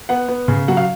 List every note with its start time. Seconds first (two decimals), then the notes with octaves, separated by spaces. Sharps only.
0.09 B3 F#5
0.28 B3
0.48 C#3
0.68 F#3 F#5
0.77 F5